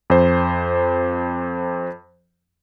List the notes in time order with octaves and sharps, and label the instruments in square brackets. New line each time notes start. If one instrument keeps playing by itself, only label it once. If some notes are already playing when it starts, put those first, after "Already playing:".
[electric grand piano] F2 C5